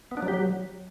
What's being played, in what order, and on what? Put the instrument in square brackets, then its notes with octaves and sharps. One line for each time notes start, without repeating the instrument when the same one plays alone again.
[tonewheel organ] B3
D4
F#3
G4
F#3